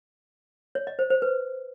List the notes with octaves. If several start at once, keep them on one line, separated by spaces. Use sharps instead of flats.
C#5
D#5
C5
C5
B4